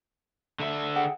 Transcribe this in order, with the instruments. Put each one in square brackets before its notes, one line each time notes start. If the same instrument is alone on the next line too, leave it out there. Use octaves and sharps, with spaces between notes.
[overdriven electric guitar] D3 E5
[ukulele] G#4 F#5 G5